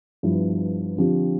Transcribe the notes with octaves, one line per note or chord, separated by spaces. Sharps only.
G2 F3 B3 E4
D3 F3 C4 G4